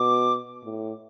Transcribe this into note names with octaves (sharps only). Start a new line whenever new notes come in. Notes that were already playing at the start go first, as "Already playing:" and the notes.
Already playing: B2 D6
A2